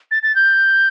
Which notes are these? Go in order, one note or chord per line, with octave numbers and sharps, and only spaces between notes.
A6
A6
G6